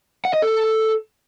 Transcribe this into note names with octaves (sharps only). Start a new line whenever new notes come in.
F#5
D#5
A4